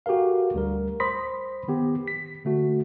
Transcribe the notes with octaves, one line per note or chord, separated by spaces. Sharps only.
F#4 G4 A4 A#4 F5
D2 G3 A#4
C5 B5 C6 D#6 A#6 B6
D#3 B3 G4
B6
D3 A3 F#4